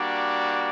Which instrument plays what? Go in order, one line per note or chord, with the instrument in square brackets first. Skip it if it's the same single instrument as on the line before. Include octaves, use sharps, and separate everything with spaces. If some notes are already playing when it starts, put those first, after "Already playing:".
Already playing: [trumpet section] G3 A#3 D4 F#4